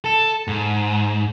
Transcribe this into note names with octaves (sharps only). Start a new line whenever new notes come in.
A4
G#2